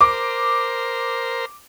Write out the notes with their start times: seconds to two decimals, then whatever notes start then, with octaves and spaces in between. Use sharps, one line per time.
0.01 A#4 C5 D6